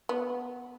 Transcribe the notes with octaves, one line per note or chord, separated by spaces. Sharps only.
B3